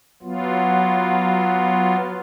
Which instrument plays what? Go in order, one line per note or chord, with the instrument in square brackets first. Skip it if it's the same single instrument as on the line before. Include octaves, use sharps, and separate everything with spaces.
[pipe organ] F#3 B3 F4